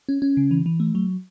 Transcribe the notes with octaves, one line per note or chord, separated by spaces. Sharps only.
C#4
C#4
C#3
E3
E3
A3
F#3